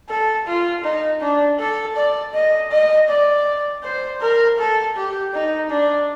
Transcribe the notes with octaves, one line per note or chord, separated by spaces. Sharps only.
A4
F4
D#4
D4
A4
D5
D#5
D#5
D5
C5
A#4
A4
G4
D#4
D4